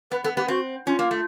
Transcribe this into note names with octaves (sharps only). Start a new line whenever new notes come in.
B3 B4
B3 A4
B3 G4
C4 F#4
C#4 F4
A#3
A3